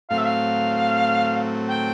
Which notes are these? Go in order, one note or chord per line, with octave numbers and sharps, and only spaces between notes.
A2 F#3 A3 C4 F5
E5
F5
G5